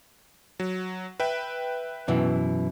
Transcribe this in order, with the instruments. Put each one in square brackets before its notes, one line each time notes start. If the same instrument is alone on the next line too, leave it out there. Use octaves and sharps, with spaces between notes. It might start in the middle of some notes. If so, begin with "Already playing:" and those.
[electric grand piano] F#3
B4 E5 G5
[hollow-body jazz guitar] F#2 B2 E3